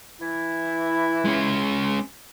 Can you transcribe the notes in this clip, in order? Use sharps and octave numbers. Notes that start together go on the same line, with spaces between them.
E3 E4
G#3 C#4